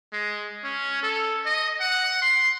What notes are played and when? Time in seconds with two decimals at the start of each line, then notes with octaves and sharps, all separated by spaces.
0.13 G#3
0.64 C#4
1.03 A4
1.46 D#5
1.80 F#5
2.22 C6